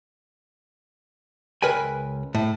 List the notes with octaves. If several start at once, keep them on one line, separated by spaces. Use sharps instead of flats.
C#2 A#4 B4 G5 G#5
A2